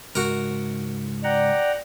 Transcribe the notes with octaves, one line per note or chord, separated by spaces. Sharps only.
C#2 G#2 F#4 A#4
D5 F#5 G5 A#5